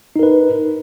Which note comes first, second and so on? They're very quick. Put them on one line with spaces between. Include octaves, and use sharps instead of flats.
D#4 A#4 B4